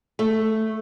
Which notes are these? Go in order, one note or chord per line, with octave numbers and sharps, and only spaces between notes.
A3